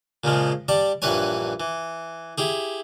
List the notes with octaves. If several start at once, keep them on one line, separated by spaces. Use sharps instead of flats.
A#2 C#3 F3 G#3
G3 D5 A5
A#1 G2 E3 B4 C#5 G#5
E3
E4 G4 G#4